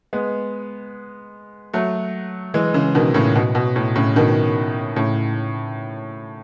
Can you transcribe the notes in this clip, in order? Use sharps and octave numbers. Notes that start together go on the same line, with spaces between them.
G#3 B3
F#3 A3
E3 G#3
C#3 E3
B2 D#3
A2 C#3
B2
B2
A2
A2 C#3
B2 D#3
A2 C#3